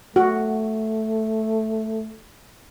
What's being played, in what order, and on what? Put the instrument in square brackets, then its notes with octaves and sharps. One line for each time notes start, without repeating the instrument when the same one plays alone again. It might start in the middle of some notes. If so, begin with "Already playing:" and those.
[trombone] A3 [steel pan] F#4